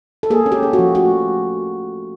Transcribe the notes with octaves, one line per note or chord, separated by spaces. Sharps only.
A4
A#3 G#4
C#4
G4
C#4
F#4
F3
A3 F#4